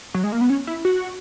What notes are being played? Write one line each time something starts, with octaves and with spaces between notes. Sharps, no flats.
F#3
G#3
A#3
B3
C#4
E4
F#4